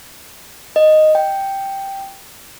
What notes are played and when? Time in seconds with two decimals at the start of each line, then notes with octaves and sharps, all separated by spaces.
0.76 D#5
1.15 G5